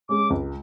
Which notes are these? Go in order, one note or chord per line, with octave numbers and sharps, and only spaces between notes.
G#3 C#4 G#4 D6
C#2